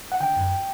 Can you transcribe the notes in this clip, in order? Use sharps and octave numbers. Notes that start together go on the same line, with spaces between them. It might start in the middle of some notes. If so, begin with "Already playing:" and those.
F#5
D3 G5
F#2